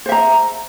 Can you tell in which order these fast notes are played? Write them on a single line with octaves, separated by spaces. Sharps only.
C5 E5 A#5